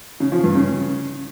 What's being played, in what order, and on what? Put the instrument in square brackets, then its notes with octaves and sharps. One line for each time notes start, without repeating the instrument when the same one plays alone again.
[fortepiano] C#3
F3
G2
C#3